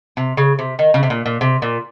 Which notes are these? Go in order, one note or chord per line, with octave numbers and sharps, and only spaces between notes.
C3
C#3
C3
D#3
C#3
C3
A#2
A#2
C3
A#2